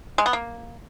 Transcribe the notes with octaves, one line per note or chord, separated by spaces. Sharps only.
G#3
B3
A#3